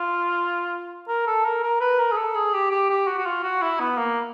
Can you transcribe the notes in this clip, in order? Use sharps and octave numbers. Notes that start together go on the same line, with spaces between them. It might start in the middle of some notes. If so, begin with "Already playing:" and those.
Already playing: F4
A#4
A4
A#4
A#4
B4
A#4
G#4
A4
G#4
G4
G4
G4
F#4
F#4
F4
F#4
E4
B3
A#3